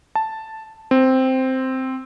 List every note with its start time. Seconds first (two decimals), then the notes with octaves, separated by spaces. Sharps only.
0.15 A5
0.91 C4